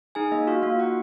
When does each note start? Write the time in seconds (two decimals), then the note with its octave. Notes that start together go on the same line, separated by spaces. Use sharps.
0.15 D#4 G#4 G#5
0.32 A#3 D#5
0.47 F4 F#4 F5
0.62 A#3 F4 F5
0.79 D#4 F#4 F#5